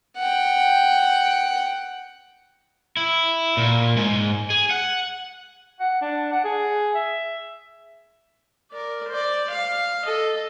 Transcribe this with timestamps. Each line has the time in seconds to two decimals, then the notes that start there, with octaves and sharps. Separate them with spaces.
0.17 F#5 G5
2.97 E4
3.57 A#2
3.97 G#2
4.50 G#4
4.70 F#5
5.80 F#5
6.02 D4
6.32 F#5
6.44 G#4
6.95 E5
8.71 A#4 D5
9.09 C5 D5
9.50 F5
10.05 A4 D#5